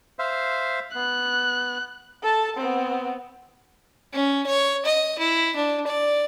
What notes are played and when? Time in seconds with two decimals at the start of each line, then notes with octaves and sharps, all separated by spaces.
0.19 C5 E5 F5
0.95 B3 F#6
2.22 A4 A5
2.57 B3 C4
4.13 C#4
4.46 C#5
4.85 D#5
5.18 E4
5.56 D4
5.87 D5